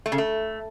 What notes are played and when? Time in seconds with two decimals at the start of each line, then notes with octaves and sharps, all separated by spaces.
0.06 A3
0.12 C#3
0.18 A3